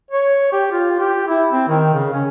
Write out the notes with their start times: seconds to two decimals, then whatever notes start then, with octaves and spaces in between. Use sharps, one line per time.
0.11 C#5
0.52 G4
0.72 F4
1.00 G4
1.28 E4
1.52 C4
1.68 D#3
1.94 C#3
2.13 C#4